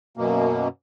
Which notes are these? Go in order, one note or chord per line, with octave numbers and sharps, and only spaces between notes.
F#2 B2 A#3